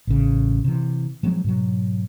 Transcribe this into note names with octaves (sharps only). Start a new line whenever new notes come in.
A1 C#3
C3 E3
F3 F#3 G#3 C4
G#2 B2 F#3